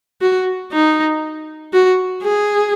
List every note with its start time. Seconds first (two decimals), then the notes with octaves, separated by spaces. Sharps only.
0.21 F#4
0.72 D#4
1.73 F#4
2.22 G#4